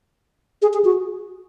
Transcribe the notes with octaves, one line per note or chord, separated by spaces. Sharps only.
G#4
G#4
F#4